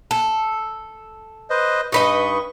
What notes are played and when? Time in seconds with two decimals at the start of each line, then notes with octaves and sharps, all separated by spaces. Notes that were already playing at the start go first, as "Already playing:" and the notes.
0.11 A4
1.50 B4 C5 D#5
1.92 G2 D#4 B4 D#5 C#6